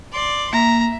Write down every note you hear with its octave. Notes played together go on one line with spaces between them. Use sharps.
D5 C6
A#3 E5 A#5